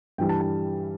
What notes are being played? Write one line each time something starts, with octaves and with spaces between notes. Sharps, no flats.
G2 E3 G3 G5
A5
A5